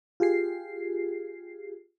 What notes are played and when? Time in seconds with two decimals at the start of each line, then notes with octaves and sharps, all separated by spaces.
0.20 F4 G4 G#4 C7